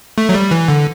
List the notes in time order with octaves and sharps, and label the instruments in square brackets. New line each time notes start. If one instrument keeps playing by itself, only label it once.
[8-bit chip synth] A3
F#3
G3
E3
D3